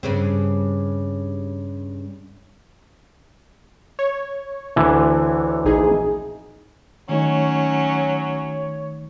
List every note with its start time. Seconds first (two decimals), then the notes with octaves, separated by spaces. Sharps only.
0.03 G2 C#3 C4
3.99 C#5
4.76 D2 D3 E3
5.65 A#1 D#4 G#4
7.09 D#3 F#3 A3 C#4 D#4 C#5